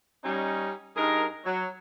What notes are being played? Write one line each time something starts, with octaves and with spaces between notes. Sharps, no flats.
G3 C#4 D#4
G2 D#4 G#4 A#4
F#3